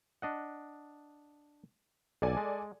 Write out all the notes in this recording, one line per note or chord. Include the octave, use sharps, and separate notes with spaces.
D4 D#5 F#5
B1 A4 D5 G#5
G#3